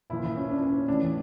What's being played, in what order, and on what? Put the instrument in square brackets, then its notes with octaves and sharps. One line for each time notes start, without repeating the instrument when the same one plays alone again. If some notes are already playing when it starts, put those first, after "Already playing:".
[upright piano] A#2 F3 E4
C#4
D4
C#4
A2 E3 D4